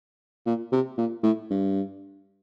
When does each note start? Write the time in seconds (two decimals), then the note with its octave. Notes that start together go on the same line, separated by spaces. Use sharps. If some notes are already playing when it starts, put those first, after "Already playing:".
0.46 A#2
0.72 C3
0.97 A#2
1.23 A2
1.50 G2